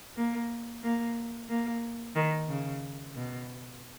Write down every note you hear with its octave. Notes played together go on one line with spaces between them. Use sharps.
A#3
A#3
A#3
D#3
C#3
B2